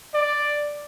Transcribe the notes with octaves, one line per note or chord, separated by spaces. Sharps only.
D5